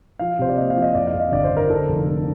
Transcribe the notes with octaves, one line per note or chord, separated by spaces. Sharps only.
F3 F5
C3 C5
D5
A#3 D#5
F5
F3
D#5
F2 D5
F5
F2
D#5
G1 D5
C5
G1
A#4
D3 A4
F1
F1